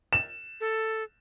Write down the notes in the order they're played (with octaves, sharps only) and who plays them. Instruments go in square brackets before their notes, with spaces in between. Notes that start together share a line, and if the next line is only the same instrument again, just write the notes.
[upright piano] E7
[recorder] A4